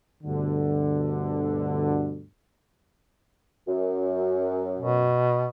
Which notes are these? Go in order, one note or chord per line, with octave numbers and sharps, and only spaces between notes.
D2 G2 B2 D3
F#2
B2